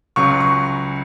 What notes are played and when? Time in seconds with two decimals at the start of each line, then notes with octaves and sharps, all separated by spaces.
0.16 C#2 C#3 F#3 C#6
0.40 C#6